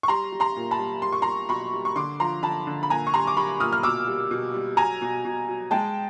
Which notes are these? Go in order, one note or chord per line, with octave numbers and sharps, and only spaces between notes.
C#6
G3 A#5 C6
G3
A#5 C6
A#2
A5 B5
G3
G3 C6
C#6
G3 A#5 C6
B2 B5 C#6
G3
C#6
D3 C6 D6
F3 A#5 C6
D3 A5 B5
D3
B5
A#2 G#5 A#5
C#6
G3 A#5 C6
D6
G3 B5 C#6
A#2 D#6 F6
F6
B2 D6 E6
G3
B2
G3
F#3 G#5 A#5
B2
B2
F#3
G#3 G5 A5